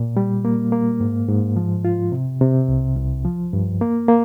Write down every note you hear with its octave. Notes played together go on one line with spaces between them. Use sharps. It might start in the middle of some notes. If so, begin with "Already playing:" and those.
Already playing: A#2
G3
A#3
A#3
G#2
G#2
F3
F4
C3
C3
C2
C2
F3
G2
A#3
A#3